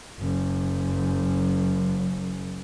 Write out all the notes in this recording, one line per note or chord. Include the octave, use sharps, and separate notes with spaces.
F#1 F#2